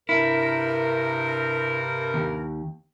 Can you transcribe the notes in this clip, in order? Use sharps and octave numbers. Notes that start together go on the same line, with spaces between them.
G2 C3 E4 A#4
D#2